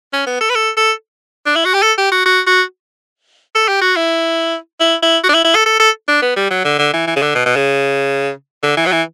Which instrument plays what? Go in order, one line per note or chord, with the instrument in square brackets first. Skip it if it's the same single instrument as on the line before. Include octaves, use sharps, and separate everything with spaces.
[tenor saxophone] C#4
B3
A4
B4
A4
A4
D4
E4
F#4
G4
A4
G4
F#4
F#4
F#4
A4
G4
F#4
E4
E4
E4
F#4
D4
E4
E4
A4
A4
A4
D4
B3
G3
F#3
D3
D3
E3
E3
C#3
D3
B2
B2
C#3
D3
E3
F#3
E3